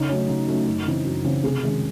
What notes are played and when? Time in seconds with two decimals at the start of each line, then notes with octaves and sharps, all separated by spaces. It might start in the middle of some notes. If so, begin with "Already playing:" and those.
Already playing: C#3 D#4
0.09 F#3 A3 C#4
0.29 C#3
0.48 F#3 A3 C#4
0.67 F#2
0.86 C#3 E3 C4
1.05 F#2
1.24 C#3 E3 C4
1.43 C3 G#4
1.63 D#3 G#3 C#4